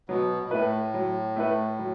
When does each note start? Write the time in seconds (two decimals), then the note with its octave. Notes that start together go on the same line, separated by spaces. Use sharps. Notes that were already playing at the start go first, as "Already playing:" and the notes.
0.09 B2 F#3 B3
0.44 B2
0.51 A2 A3 E4 B4
0.94 F#3
1.36 A3 E4 B4
1.79 F#3